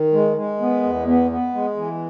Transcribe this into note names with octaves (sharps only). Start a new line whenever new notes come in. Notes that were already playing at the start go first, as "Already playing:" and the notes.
Already playing: D#3
G#3
G#3
B3
E2
B3
B3
G#3
E3